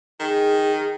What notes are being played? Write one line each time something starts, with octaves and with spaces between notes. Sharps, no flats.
D#3 G#4